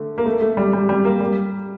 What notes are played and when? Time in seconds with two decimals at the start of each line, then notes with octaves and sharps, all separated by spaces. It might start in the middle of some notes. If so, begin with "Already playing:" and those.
Already playing: D3 A3
0.18 A#3
0.26 A3
0.42 A3
0.57 G3
0.73 G3
0.89 G3
1.05 A#3
1.20 G3